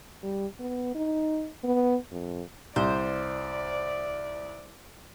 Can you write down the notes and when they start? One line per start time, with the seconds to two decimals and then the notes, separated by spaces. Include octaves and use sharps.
0.23 G3
0.60 B3
0.95 D#4
1.64 B3
2.12 F2
2.76 C2 C5 D5